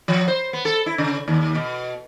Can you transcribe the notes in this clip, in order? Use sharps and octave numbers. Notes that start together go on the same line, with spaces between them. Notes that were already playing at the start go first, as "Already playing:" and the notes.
F3
C5
B3
A4
E4
C#3
D#2
B2